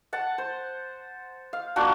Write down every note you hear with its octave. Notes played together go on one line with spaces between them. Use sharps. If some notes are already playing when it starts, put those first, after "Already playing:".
F#5 A5
C5
F5
A#3 D4 F4 F#4